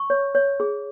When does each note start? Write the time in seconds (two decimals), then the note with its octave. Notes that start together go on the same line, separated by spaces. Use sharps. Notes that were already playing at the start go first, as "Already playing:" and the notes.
Already playing: C#6
0.10 C#5
0.35 C#5
0.60 G#4